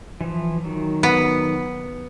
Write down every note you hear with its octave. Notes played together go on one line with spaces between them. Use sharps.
E3 F3
D#3 F#3
B3